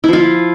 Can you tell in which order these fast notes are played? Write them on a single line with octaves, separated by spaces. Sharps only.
E4 F3 F4